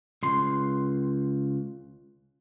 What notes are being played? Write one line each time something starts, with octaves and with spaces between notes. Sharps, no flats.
C#2 C6